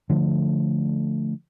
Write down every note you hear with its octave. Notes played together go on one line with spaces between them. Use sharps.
D3 F3 A3